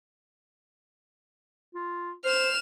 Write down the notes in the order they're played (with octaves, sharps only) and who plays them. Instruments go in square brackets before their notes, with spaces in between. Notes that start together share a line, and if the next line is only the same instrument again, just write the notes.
[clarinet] F4
[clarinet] C5 [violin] F6 E7